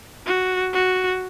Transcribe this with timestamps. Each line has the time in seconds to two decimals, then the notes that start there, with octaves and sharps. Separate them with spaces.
0.26 F#4
0.74 F#4